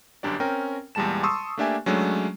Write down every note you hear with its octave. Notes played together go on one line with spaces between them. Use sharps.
G1 F#2 D4 G4 D5
C4 C#4 A#4 G5 A#5
E2 A#2 G3 G#3 A5 E7
A5 C6 C#6 D#6 E6
A3 A#3 D4 G4 E5 G#5
F#3 G#3 A3 C#4 D4